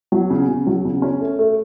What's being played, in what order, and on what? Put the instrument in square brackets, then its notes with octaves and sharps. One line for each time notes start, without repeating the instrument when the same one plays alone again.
[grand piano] F#3
C#3
C#3
F#3
C#3
C#4
A3
A3